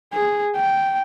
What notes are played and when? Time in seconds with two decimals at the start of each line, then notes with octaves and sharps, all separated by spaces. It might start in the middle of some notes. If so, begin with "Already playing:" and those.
0.13 G#4
0.56 G5